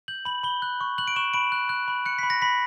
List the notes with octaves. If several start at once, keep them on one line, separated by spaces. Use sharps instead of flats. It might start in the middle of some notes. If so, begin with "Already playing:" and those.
G6 F#7
B5 F#7
B5 G7
F#6
C#6
F#6 F#7
D7
C#6 E7
B5 D7
F#6
F#6
B5
F#6 C#7
B6
B5
A#6
B5 B6